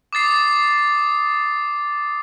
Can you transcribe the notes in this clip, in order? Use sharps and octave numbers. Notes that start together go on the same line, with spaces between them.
D6 D#6 A6 C7